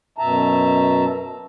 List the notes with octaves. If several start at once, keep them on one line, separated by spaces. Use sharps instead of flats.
F#2 B2 E5 A5 A#5